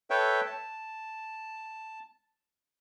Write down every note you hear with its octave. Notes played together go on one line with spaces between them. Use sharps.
A4 B4 C#5 E5 G5
A5